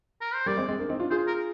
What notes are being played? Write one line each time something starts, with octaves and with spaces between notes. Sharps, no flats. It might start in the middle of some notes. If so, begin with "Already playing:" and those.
A#4
C5
G3 A#3 D5
G#3 C4
G#3 C4
A#3 D4
C4 D#4
D4 F4
F4 G#4 C5
A#4